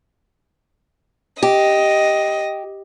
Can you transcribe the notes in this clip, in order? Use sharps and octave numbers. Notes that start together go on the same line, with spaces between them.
G4 D#5